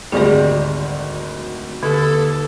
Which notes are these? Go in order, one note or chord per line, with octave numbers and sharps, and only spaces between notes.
G#1 D2 C3 G3 G#4 D5
D#2 D3 A4